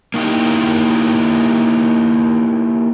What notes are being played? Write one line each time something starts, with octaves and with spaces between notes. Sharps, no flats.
A#3 D#4 E4 G4